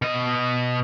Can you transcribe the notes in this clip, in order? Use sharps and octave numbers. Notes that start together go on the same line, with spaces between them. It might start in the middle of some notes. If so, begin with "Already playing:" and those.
B2 D#5